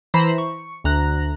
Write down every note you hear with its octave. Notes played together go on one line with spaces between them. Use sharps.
E3 C5 A#5 B5 E7
C#6
D2 A#5 F#6